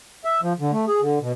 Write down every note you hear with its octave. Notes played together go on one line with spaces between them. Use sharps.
E5
F3
D3
A3
G#4
D3
B2